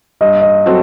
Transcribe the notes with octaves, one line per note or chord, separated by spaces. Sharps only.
G2 D#5
D#5
F#3 C4 F#4 A4